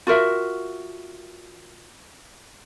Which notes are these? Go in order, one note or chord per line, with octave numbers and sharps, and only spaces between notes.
F4 F#4 A#4 E5